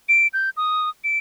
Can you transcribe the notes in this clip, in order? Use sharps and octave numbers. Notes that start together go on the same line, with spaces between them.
D7
G6
D#6
D7